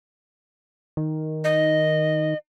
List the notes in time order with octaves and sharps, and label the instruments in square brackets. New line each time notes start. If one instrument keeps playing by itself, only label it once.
[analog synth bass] D#3
[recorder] D#5